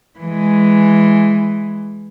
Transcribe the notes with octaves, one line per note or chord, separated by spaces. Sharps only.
E3 G#3